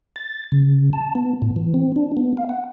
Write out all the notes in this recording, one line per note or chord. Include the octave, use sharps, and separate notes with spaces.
A6
C#3
A5
B3
A2
E3
C4
D4
B3
F5
F#5